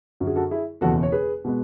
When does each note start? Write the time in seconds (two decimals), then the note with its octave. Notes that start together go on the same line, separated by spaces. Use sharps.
0.20 F#2 D3 F#3
0.27 G#4
0.36 F#4 A4
0.51 E4 G#4
0.81 F#1 E2 B2 F#4 A4
1.03 C#5
1.12 G#4 B4
1.44 B2 G#3 B3